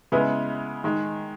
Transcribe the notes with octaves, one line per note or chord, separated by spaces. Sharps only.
C#3 G#3 B3 E4
D#3 G#3